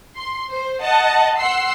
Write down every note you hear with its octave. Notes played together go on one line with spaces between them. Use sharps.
C6
C5
D#5 F#5 A5
F#5 C6 E6 C7